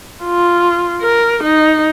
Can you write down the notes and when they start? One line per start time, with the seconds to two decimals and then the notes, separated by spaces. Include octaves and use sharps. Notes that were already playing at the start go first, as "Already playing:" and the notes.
0.24 F4
1.01 A#4
1.43 D#4